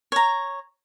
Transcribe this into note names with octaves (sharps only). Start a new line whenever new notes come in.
C#5 A#5